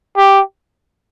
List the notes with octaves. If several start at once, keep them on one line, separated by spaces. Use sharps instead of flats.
G4